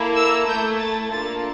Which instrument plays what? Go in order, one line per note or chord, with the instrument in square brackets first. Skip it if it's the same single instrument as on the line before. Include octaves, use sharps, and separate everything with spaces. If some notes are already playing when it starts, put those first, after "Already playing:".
Already playing: [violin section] A#3 E4 A4
E6
A3 E4 A4 G6
A6
A#3 D4 F4 A4 A6